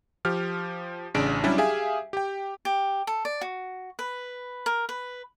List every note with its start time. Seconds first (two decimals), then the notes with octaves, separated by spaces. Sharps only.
0.25 F3 G4 F6
1.15 A1 C#3 D4 D7
1.43 F#3 G3 C#4 D4 E4 G4
1.58 G4 G#4 E5 F5 G#5
2.13 G4 G5
2.65 G4
3.07 A4
3.25 D5
3.41 F#4
3.99 B4
4.66 A#4
4.89 B4